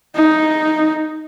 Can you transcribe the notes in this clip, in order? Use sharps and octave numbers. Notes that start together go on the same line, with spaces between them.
D#4